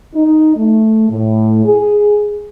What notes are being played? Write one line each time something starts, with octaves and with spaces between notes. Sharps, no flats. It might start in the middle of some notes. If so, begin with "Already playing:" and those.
D#4
A3
A2
G#4